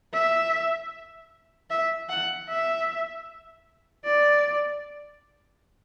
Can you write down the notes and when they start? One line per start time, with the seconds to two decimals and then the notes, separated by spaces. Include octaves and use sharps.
0.14 E5
1.70 E5
2.09 F#5
2.49 E5
4.05 D5